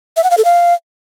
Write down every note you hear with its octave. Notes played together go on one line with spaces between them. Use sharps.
E5
F#5
F5
A4
F5